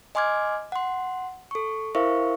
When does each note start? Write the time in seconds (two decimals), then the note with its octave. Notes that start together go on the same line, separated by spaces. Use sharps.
0.15 D#5 G#5 C6 D6 F6 G#6
0.72 F#5 C6
1.51 A4 C#6
1.95 E4 A#4 C5 E5 F5 C#6